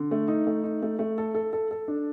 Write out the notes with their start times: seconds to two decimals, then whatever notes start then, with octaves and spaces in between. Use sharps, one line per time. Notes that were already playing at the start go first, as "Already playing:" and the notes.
Already playing: D3
0.11 A3
0.28 D#4
0.47 A3
0.64 D#4
0.82 A3
0.99 A3
1.18 A4
1.35 A4
1.53 A4
1.71 A4
1.88 D4